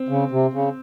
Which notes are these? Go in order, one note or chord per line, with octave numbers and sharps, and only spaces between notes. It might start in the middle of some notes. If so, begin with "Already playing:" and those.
Already playing: C4
C#3
C3
C#3